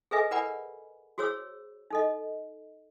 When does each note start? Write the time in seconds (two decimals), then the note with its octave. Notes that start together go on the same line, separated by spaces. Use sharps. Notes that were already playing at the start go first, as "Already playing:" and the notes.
0.11 G#4 A4 B4 D#5 E5 G#5
0.31 A#4 B4 D5 F#5 G#5 B5
1.18 F#4 G#4 C5 C#5 E6
1.90 D#4 A4 D#5